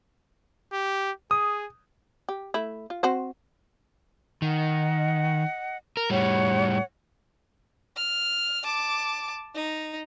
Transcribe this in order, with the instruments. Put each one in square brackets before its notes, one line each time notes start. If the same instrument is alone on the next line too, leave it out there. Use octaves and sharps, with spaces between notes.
[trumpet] G4
[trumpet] G#4 [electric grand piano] D#6
[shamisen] G4
A3 E4
F4
C4 F#4 C5
[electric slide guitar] D#3 [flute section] D#5 F#5
[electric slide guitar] A#4
[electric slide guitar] A2 G3 [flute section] C#5 F#5
[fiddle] F6
A5 D6
D#4